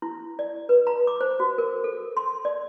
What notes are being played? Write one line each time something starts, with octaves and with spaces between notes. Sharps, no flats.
E4
D5
B4
A#5
D6
C5
F#4
A#4
A4
C6
D5